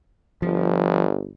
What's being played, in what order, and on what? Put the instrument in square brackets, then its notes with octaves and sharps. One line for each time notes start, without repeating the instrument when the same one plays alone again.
[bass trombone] G1 [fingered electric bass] F3